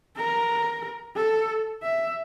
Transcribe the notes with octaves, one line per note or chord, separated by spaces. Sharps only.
A#4
A4
E5